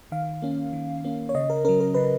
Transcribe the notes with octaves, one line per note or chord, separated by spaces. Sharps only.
D#3 F5
A#3 C#4
D#3
A#3 C#4
C#5
C#3 D#5
A#4
F#3 C#4 A#4
A#4
C#3 B4